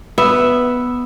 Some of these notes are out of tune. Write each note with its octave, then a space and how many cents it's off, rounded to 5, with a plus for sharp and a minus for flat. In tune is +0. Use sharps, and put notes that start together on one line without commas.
B3 +0 E5 +0